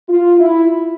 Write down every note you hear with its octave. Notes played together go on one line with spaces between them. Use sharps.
F4
E4